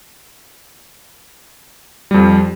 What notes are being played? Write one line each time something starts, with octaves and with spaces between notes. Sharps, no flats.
F2 F3 G3